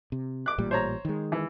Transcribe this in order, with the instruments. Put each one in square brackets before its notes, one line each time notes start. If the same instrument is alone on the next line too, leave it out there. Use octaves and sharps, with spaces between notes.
[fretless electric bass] C3
[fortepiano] D6 F#6
[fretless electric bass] A1 A#2 G3
[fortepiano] C5 C#5 A#5
[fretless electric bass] D#3 G#3
[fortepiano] E3